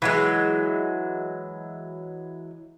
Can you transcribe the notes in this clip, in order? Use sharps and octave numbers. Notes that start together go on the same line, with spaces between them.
E3 F#3 G#3